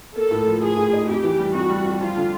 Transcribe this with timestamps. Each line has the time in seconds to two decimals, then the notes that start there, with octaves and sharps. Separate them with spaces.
0.15 A#3 A4
0.31 A2
0.47 F3
0.62 F3 G#4
0.77 A2
0.93 D#4
1.09 F2 G4
1.24 E3
1.39 G3
1.54 F2 F#4
1.70 G3
1.85 F2
2.01 F3 F4
2.16 D3